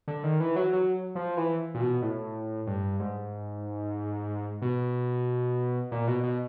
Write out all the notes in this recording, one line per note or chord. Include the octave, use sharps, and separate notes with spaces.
D3
D#3
E3
F#3
F#3
F3
E3
A#2
B2
A2
G2
G#2
B2
A#2
B2
B2